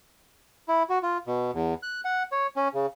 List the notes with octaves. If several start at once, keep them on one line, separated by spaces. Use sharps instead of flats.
E4
F#4
F4
B2
E2
F#6
F#5
C#5
C#4
C#3